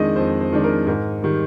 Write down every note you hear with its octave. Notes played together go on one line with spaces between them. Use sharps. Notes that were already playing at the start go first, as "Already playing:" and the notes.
Already playing: F2 D#3 G#3 D4 D#5
F2 C5
C5
D#3 G#3 D4
A#4
G#2 A#4
D#3 G3